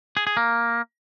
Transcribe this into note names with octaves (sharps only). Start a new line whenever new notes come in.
G#4
G#4
A#3